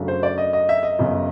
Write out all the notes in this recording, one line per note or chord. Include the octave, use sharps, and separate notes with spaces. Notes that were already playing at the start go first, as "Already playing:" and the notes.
Already playing: F#2 C#3 F#3 A3 D4
C5
D5
D#5
D#5
E5
D#5
G1 F#2 C#3